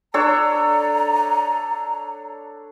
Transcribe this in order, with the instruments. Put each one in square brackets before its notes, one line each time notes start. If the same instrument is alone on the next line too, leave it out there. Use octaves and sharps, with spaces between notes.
[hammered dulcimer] D4 A4 C#5 [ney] A#5